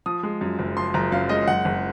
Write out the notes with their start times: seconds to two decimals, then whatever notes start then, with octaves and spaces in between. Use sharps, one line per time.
0.06 F3 D#6
0.23 G#3
0.41 F#2
0.59 F#1
0.77 F3 C6
0.94 F#1 A#5
1.12 F#2 F5
1.29 G#3 D#5
1.48 F#1 F#5
1.65 F#1